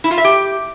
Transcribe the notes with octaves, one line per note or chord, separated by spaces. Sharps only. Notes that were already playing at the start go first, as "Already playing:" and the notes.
E4
F4
E5
G4